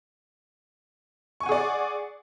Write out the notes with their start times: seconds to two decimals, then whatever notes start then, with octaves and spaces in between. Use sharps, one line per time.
1.40 C#6
1.43 G#5
1.46 F#5
1.49 G#4
1.52 D5